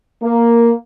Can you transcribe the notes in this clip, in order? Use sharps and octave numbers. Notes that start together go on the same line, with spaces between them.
A#3